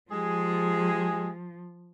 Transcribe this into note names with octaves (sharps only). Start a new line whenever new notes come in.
F3 G#3 G4 G#4